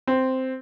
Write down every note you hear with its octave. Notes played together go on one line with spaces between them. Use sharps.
C4